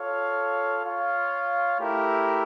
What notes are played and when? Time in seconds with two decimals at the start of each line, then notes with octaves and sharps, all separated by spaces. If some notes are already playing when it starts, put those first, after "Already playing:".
Already playing: F4 A4 C#5 F5
0.82 F4 C#5 F5
1.77 A3 E4 G4 A#4